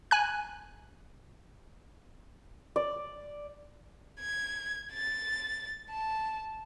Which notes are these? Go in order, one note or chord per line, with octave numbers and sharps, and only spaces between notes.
G#5 F#6
D5
G#6
A6
A5